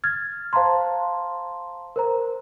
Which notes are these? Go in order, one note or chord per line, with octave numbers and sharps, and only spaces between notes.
F6 G#6 A6
C5 F5 A5 A#5 C6
A#4 C5 A#5